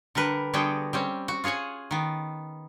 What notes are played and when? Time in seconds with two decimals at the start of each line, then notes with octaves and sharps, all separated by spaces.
0.15 D3 G3 A#4 B4
0.53 D3 G3 B3 F#4 G#4 G5
0.93 G3 C4 C#4
1.28 F#4
1.44 F4 G#4 C#5 F#5 G#5
1.91 D#3 B3